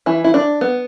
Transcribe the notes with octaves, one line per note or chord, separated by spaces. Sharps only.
E3 E4
E4
D4
B3